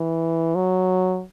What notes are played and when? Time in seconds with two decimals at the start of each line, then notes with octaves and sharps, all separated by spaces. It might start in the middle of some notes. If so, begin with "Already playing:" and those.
Already playing: E3
0.55 F#3